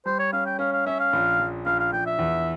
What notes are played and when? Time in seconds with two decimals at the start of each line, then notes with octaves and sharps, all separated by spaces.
0.06 G3 C5
0.19 C#5
0.33 C#4 F5
0.46 G5
0.59 C#4 F5
0.73 F5
0.86 C#4 E5
0.99 F5
1.13 A#1
1.39 A#1
1.66 A#1 F5
1.79 F5
1.92 A#1 G5
2.06 E5
2.19 E2